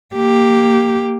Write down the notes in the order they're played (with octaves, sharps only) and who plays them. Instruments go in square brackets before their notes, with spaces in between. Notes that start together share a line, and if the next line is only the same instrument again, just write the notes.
[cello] A#3 G4